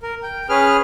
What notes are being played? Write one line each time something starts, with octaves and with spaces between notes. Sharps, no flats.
A#4
G5
C#4 G#4 B4 F6